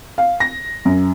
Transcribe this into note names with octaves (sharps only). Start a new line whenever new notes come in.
F5
A#6
F#2